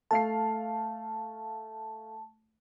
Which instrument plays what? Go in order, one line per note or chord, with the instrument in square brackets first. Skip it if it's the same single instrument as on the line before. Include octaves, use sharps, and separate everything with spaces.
[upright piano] A3 F5 C7 [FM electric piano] A5